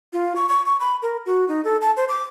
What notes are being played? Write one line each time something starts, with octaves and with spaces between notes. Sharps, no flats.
F4
C#6
C#6
C#6
B5
A#4
F#4
D#4
A4
A5
C5
D6